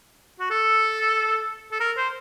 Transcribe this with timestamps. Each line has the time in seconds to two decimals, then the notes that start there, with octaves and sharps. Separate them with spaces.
0.40 F#4
0.51 A4
1.72 A4
1.80 A#4
1.97 C5